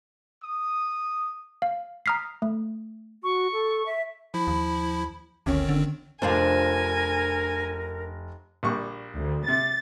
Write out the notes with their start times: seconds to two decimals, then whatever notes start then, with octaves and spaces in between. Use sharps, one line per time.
0.43 D#6
1.62 F5
2.06 A#5 D#6 F6 B6 C7
2.42 A3
3.24 F#4 C#6
3.53 A4
3.86 E5
4.34 F3 E4 B5
4.47 D#2
5.46 G1 D2 D#3 C4 C#4
5.69 D3
6.22 F1 C4 D4 F4 A#4 G#5
8.63 A#1 G3 C#6
9.17 D2
9.48 C3 A6